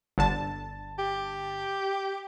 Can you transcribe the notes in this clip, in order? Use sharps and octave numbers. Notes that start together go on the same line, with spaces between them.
G1 D3 A5
G4